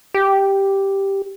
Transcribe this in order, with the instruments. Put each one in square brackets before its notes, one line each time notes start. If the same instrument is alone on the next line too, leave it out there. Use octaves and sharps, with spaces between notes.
[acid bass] G4